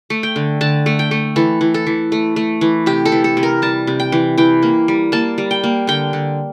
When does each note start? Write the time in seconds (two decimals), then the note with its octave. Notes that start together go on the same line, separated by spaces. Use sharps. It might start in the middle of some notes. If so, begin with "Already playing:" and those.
0.10 A3
0.23 G5
0.36 D3
0.61 D3 A5
0.86 A3
0.99 G5
1.11 A3
1.36 E3 A4
1.61 E3
1.74 A4
1.87 E3
2.12 A3
2.36 A3
2.61 E3
2.86 C3 G4
3.05 A4
3.12 E3
3.24 A4
3.37 C3
3.43 A#4
3.62 G3 A5
3.87 C3
4.00 G5
4.12 E3
4.38 E3 G5
4.63 A#3
4.88 G3
5.12 A#3 A5
5.38 G3
5.51 G5
5.64 A#3
5.87 D3 G5
6.13 D3